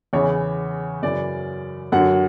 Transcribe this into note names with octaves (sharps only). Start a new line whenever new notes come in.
E2 C#3 E3 C#5
F#2 C#3 E3 D5
F#2 D3 F#3 F#5